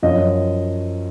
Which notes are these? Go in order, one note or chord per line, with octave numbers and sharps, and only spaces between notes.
F#2 F3 D#5